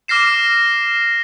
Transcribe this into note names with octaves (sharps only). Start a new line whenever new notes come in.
D6 F6 A#6 C7 E7